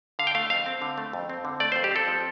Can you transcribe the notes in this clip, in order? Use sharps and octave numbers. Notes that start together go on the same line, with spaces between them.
D3 F5
G5
A3 F5
F2 F5
C4
D3
A3
F2
C4
D3
A3 D5
F2 C5
G4
C4 A4
F3